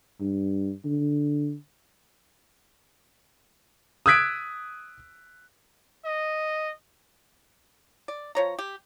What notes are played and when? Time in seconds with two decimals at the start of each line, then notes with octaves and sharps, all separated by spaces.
0.21 G2
0.85 D3
4.06 D#6 E6 F#6 G#6 B6 D7
6.05 D#5
8.08 D5
8.35 F3 C#5 A#5
8.59 G4